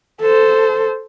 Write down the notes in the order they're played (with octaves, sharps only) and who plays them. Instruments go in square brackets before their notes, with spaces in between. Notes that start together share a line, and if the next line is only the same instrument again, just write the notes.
[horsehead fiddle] A4 C5